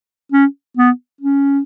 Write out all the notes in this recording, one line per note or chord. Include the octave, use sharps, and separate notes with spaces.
C#4
B3
C#4